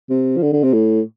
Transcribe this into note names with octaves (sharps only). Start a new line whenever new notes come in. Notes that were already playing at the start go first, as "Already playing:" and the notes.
C3
F3
D3
D3
C3
A2